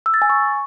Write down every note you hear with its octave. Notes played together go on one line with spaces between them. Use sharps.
E6
A6
G#5
C#6